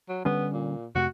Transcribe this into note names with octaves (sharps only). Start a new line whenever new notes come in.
F#3
D3 G3 B3 C#4
A#2
F2 C3 A3 F#4